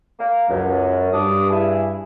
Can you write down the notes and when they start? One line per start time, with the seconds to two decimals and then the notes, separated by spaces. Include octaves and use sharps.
0.19 A#3
0.49 C#2 F#2
1.13 G2 D4 D6 D#6
1.50 E4 G#4